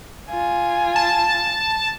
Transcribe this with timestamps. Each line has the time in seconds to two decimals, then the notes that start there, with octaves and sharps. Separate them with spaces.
0.29 F4 G#5
0.96 A5